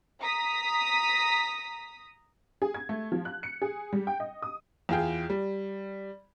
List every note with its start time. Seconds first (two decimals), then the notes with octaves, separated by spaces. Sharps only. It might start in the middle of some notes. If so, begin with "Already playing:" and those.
0.21 A#5 D#6 B6
2.62 G#4
2.74 G#6
2.89 A3
3.12 F3
3.25 F#6
3.43 C#7
3.62 G#4
3.93 G3
4.07 G5
4.20 D#5
4.42 D#6
4.89 E2 F4 G#4 G5
5.30 G3